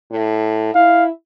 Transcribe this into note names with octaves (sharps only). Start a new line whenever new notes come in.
A2
E4 F5